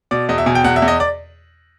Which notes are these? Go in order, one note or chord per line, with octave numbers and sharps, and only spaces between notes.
B2 D5
E2 D#5
E5
B2 G#5
G5
E2 F#5
E5
E2
D#5
D5